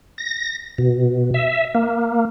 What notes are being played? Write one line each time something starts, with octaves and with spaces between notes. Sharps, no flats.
A#6
B2
E5
A#3